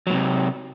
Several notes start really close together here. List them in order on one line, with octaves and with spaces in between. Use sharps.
F#3 A2 C3